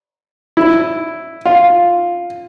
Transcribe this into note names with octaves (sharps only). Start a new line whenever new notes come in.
E4
F4